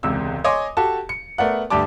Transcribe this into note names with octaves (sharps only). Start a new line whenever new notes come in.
E1 C#2 C3 E6
C#5 D#5 G#5 C6 D6 D#6
F#4 G4 A4 A5
C#7
A3 B3 A#4 D5 F#5
D2 G2 G4 D5 A5 D6